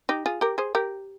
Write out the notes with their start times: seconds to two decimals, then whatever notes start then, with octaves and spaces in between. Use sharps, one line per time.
0.09 D#4 G4
0.26 F4 G#4
0.41 G4 A#4
0.58 G#4 C5
0.75 G4 A#4